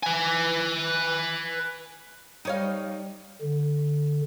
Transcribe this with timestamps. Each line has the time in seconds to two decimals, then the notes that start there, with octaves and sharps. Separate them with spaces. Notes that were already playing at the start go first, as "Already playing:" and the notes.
0.03 B4 G#5
2.45 G3 D#4 C#5 F5
3.42 D3